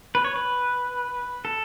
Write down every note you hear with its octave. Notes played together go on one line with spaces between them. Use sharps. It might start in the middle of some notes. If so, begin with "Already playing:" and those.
B4
C#5
B4
A4